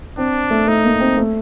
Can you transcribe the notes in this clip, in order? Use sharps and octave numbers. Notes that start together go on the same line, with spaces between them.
C4 D4
A3
A3 D#4
A#3
C4
A3